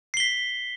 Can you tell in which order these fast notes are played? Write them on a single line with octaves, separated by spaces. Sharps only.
C7 G7 B6